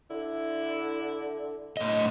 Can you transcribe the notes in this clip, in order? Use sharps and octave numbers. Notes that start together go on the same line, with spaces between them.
D3 E4
A2 D#5